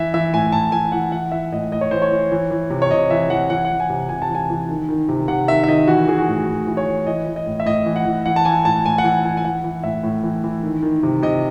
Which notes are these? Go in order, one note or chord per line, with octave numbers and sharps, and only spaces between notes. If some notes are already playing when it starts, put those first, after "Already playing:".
Already playing: E3 E5
E3 E5
A2 G#5
A2 A5
E3 G#5
E3 F#5
E3 F#5
E3 E5
A2 D#5
A2 D#5
C#5
E3 C5
C#5
E3
E3
E3
C3
C#5
C3 D#5
E3 E5
E3 F#5
E3 F#5
F#5
E3
G#5
C3
C3 G#5
A5
E3
G#5
E3
D#3
D#3
C3
C3 F#5
D#3 E5
E5
D#3 D#5
E3 F#4
E3 G#4
F#4
A2
A2
E3
C#5
E3
E3 D#5
E3
D#5
A2
E5
A2 D#5
E3
F#5
E3
E3 F#5
A5
E3 G#5
A2 A5
A2 G#5
F#5
E3 G#5
E3 G#5
G#5
E3 F#5
E3
A2 E5
A2
E3
E3
D#3
D#3
C3
C3 D#5